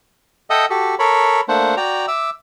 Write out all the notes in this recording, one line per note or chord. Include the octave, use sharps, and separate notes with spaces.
A4 D#5 E5 F#5 G5 D#6
F#4 G4 A4
A4 A#4 C#5 B5
A3 A#3 D4 C5 F#5
F#4 D5 G5 A#5
E5 D6 E6